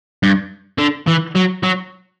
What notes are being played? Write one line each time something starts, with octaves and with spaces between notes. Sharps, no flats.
G2
D3
E3
F#3
F#3